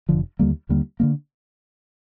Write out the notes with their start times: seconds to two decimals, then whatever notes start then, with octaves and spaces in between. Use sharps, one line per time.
0.09 F1 D#2 D3 F3
0.39 D#2 D3 G3 A#3
0.69 D#2 D3 G3 A#3
1.00 D3 G3 A#3